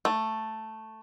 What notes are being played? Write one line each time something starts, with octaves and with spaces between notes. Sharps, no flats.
A3